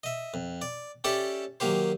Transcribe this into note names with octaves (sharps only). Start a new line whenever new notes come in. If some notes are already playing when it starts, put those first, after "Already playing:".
D#5 E5
F2
D5
C#4 G4 A4 D5 E5 A5
D#3 F#3 A#3 G4 C5